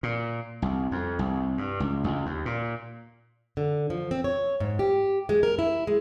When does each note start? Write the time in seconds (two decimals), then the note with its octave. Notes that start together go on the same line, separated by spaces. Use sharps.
0.03 A#2
0.62 C2
0.91 F2
1.19 C2
1.58 G2
1.80 C#2
2.04 C#2
2.26 D#2
2.46 A#2
3.57 D3
3.90 F3
4.11 C4
4.24 C#5
4.60 G#2
4.79 G4
5.29 G#3
5.43 A#4
5.59 E4
5.87 G#3